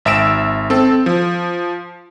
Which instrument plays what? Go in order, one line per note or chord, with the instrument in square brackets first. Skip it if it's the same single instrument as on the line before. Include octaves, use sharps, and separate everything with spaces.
[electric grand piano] G#1 E5 E6 D7 E7
C4 A4
F3